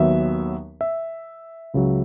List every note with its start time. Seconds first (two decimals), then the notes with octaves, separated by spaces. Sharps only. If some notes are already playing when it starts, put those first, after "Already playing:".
Already playing: D#2 D#3 F#3 B3 E5
0.81 E5
1.74 C#2 C#3 F#3